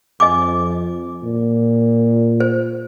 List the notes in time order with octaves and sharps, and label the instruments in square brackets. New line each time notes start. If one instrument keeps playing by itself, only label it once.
[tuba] F2 [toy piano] D#5 G#5 D6
[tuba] A#2
[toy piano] C5